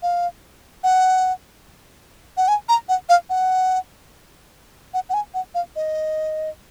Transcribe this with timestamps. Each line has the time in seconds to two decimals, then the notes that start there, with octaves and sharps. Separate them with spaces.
0.03 F5
0.84 F#5
2.37 F#5
2.48 G#5
2.69 A#5
2.89 F#5
3.09 F5
3.30 F#5
4.94 F#5
5.09 F#5
5.14 G#5
5.34 F#5
5.55 F5
5.76 D#5